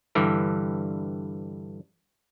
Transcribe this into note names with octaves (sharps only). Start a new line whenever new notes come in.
G2 D3 E3 G3